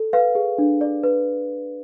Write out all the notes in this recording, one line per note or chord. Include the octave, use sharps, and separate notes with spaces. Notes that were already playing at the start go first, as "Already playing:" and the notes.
Already playing: A4
B4 F5
G#4
D4
D5
B4